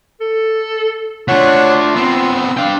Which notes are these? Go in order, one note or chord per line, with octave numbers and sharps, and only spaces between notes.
A4
A3 D4 F4 C#5 F#5
B3 C4 E6
D4 F5 G5